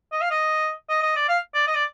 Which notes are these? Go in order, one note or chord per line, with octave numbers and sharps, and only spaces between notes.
D#5
F5
D#5
D#5
D#5
D5
F5
D5
D#5
D5